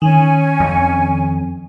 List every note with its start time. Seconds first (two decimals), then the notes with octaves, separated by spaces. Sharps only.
0.02 D#3 C#4 G#5
0.60 F2